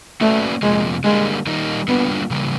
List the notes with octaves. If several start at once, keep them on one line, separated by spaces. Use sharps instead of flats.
A3 A#3 C#4 F#4 B4 D5
F2 C3 F3 G#3 A#3
D3 G3 G#3 A#3
D#3 G3 A#3 D#4
D3 G3 A#3 B3 D4 F4
C#3 E3 G3 A#3